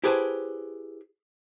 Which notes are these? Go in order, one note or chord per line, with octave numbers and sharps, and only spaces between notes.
E4 G4 G#4 B4 C5 A5